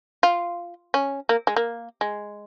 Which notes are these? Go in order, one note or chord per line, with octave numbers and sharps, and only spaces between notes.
F4
C#4
A#3
G#3
A#3
G#3